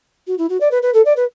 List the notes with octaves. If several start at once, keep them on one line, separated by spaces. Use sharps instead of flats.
F#4
E4
F#4
D5
B4
B4
A4
D5
B4